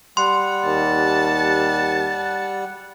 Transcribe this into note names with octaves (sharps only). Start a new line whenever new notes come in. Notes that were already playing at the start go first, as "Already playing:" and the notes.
G3 F#5 C6
D#2 A5